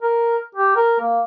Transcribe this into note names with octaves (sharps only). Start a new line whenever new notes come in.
A#4
G4
A#4
A#3